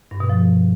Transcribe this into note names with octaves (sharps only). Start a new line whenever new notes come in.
G2
B2
F3